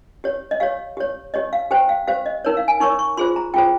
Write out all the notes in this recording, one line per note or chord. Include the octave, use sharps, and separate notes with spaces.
G4 C#5
D#5
G4 C#5 F5
G4 C#5
G4 C#5 D#5
F5
G4 C5 G5
F5
G4 C5 F5
D#5
D#4 A#4 C#5
F5
G#5
D#4 A#4 C#5 C#6
C#6
F4 G#4 C5 C6
A#5
F4 G#4 C5 G5